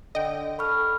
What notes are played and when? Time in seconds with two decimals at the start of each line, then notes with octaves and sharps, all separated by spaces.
0.15 D3 D#5 G5
0.59 A4 B5 C#6 F6